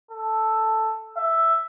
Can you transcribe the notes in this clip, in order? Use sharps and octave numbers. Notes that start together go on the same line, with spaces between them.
A4
E5